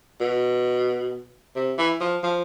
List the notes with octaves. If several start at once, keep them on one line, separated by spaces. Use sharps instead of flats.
B2
C3
E3
F3
F3